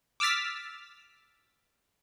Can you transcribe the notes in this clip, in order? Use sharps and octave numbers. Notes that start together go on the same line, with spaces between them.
D6 E6 F6 A6 B6